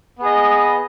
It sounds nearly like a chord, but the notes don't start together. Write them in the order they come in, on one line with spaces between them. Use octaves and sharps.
B3 G#4 D#5